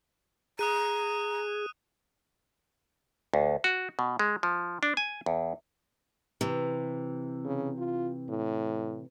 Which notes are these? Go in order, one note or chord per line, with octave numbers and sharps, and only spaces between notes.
G#4 A#5 D#6 F#6 D#7
D2
F#4
B2
G#3
F3
D4
G#5
E2
C3 E3
C#3
F4
A2